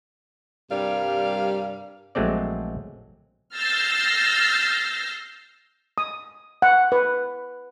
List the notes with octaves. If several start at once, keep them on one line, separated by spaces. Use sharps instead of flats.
G2 C3 G3 A#4 D5 F5
A#1 F#3 G#3 A3 C4 D5
E6 F6 G6 A6 A#6 C7
D#6
F#5
B4